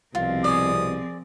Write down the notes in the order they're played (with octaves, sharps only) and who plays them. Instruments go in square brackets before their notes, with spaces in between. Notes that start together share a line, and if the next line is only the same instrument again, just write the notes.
[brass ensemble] C2 B2 [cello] F3 C4 [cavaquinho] F4
[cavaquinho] G#4 D5 [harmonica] D#6